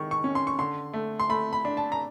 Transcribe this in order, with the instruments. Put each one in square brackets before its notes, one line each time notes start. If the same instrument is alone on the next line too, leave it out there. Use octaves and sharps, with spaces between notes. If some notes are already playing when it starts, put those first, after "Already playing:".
Already playing: [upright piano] D#3 G#3 C#6
C#6
C#4
C6
C#6
D3 C6
A3
C6
A3 B5
B5
D4
A5
A#5